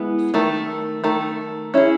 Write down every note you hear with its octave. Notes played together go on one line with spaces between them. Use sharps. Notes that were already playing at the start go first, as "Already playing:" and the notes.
Already playing: G#3 B3 E4
D#3 A3
D#3 A3
C#4 E4 G#4